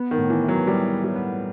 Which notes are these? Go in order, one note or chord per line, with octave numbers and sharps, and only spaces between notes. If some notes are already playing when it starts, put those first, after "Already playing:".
Already playing: B3
D#3
A2
E3
A2
F#3
A2 G3
A2
G3
B3